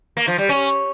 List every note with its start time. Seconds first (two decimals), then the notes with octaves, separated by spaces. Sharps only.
0.17 A#3
0.27 F3
0.38 G3
0.49 C#4